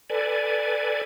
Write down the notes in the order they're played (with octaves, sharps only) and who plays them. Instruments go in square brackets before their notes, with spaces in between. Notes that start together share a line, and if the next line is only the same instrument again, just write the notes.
[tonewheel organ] A4 B4 D5 G#5